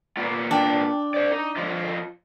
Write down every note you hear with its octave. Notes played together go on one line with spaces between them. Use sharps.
A#3 B3 F4
D4 G5
C5 D5
D#4
F3 F4 D#5